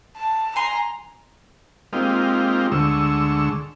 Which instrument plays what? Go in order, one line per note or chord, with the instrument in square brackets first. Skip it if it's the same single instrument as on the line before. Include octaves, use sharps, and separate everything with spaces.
[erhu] A5
[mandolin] G#5 C6 [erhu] A#5
[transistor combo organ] G#3 A#3 C4 D#4 F4 G4
D2 D3 G#3 C#6 E6